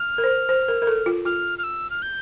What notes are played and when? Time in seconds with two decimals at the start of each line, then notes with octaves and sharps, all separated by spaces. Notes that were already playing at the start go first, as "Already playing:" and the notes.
Already playing: F6
0.18 A#4
0.24 C5
0.49 C5
0.68 A#4
0.82 A#4
0.87 A4
1.06 F4
1.25 F4 F6
1.59 F6
1.64 E6
1.90 F6
2.02 G6